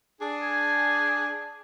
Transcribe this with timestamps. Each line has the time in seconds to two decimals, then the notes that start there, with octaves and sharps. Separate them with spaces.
0.20 D4 G#4
0.42 G#5